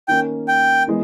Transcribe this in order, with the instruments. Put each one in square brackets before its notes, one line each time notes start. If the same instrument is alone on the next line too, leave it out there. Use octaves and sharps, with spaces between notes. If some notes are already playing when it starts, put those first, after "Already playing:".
[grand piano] D#3 A#3 C#4 [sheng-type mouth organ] G5
[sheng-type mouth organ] G5
[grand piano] E3 G#3 B3